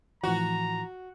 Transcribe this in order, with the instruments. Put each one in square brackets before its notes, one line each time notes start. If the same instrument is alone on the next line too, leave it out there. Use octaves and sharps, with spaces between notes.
[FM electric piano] A2 E3 F3 [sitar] F#4 [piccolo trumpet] A#5